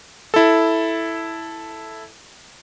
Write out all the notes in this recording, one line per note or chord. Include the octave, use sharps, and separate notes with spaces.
E4 A4